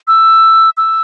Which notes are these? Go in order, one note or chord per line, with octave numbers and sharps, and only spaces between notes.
E6
E6